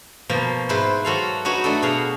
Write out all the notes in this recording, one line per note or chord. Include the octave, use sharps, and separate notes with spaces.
B2 F3 A#3
G#2 E4 B4 C5
F#3 F#4 A4 F5
D#4 F#4 B4 C#5 D#5
A3 D4 A4
B2 G#4 F5 F#5